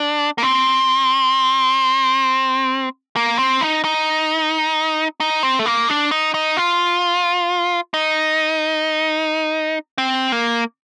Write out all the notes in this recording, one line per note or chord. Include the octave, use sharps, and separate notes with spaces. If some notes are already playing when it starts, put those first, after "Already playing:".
Already playing: D4
A#3
C4
A#3
C4
D#4
D#4
D#4
C4
A3
A#3
D4
D#4
D#4
F4
D#4
C4
A#3